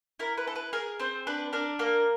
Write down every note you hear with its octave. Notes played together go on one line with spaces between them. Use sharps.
E4 A#4
B4
A4
B4
G#4 A#4
C4 C5
D4 B4
D4 A#4
A#3 A#4